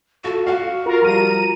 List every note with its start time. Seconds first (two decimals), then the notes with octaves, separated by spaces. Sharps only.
0.24 F4 F#4 A4
0.47 F#4 F5 F#5
0.86 F4 A#4
1.01 F3 G3 A#5 D#7